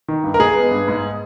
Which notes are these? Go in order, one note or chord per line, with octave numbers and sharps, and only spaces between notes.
D#3
G2
A#4
G#3 G#4
B3
G2
G#2